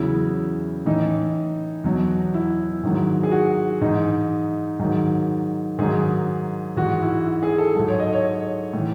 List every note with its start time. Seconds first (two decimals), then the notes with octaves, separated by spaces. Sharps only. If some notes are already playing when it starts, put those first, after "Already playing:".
Already playing: E2 C#3 F#3 E4
0.86 A2 E3 D#4
1.84 E2 B2 F#3
2.34 E4
2.83 G#2 D#3 F#3
3.23 G#4
3.31 F#4
3.81 G#2 E3 D#4
4.79 G#2 D#3 F#3
5.79 G#2 D#3 F#3 G#4
6.76 G#2 E3 F#4
7.02 E4
7.26 E4
7.43 G#4
7.58 A4
7.75 G#2 F#3 A4
7.88 C#5
7.99 D#5
8.13 C#5
8.73 A2 E3